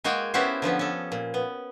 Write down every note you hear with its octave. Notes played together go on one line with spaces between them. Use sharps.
G#3 A#3 F#4 G#4 G5 G#5
B3 C#4 E4 F#4 G4 C5
D3 F3 B3 C#4
C#4 A4
A#2
B3